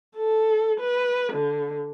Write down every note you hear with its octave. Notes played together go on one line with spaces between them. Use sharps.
A4
B4
D3